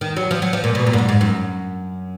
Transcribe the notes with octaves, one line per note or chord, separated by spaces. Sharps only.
D#3
F#3
F3
F#3
F3
A#2
B2
A#2
G#2
F#2
G#2
F#2